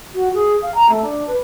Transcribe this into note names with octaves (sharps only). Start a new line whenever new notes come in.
F#4
G#4
F5
A#5
A3
D4
B4